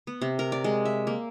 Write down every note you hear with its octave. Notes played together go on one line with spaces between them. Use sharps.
B3
C3
A#4
D5
G#3
E5
A#3